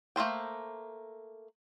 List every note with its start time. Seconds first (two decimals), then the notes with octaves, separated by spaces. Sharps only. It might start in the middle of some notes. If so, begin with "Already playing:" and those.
0.16 A3 A#3 C5 G5